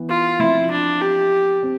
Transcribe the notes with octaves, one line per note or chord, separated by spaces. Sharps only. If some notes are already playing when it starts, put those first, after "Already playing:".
Already playing: E3 B3
F4
F3 C4 E4 F4
D4
G4
C4